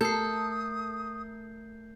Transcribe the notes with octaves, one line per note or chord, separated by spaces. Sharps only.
A3 A4 A#4 D#6 G6 C7